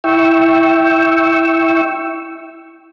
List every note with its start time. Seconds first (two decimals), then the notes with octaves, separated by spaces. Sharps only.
0.04 E4 G5 C#6 E6